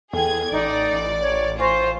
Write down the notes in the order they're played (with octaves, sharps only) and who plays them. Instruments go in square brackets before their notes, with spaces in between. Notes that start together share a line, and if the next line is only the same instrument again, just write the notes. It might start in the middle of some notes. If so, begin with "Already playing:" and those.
[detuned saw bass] E2 [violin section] G#4 G#6 [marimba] A4 G5
[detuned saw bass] A1 [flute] D#4 [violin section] D5
[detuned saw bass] A1
[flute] C#5
[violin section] F4 [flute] C5 [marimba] G#5 C#6 A#6